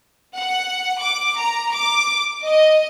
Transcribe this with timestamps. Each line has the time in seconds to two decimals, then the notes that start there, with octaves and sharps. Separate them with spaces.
0.37 F#5
1.01 D6
1.38 A#5
1.74 D6
2.45 D#5